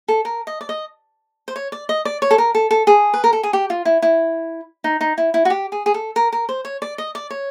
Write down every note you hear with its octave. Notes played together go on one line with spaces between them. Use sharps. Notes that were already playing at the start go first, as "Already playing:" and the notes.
A4
A#4
D#5
D5
D#5
C5
C#5
D5
D#5
D5
C#5
A4
A#4
A4
A4
G#4
B4
A#4
A4
G#4
G4
F4
E4
E4
D#4
D#4
E4
E4
F#4
G4
G#4
G#4
A4
A#4
A#4
C5
C#5
D5
D#5
D5
C#5